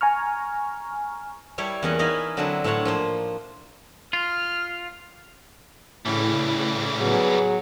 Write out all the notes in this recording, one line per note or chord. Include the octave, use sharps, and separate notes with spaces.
G#5 A#5 C#6 F6
G3 E4 C#5 G5 A5
E2 A#3 C#4 D#5 F#5
C#4 D#4 E4 B4 D#5 F5
D3 F#3 C4 D4 E4 B4
A2 D4 C5 C#5 F#5 A5
F3 A#3 C5
F4 F6
A2 C#3 E3 G3 E4
F#3 B3 G#4